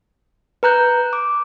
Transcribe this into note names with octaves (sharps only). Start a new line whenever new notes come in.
B4 A#5 F#6 G6
D6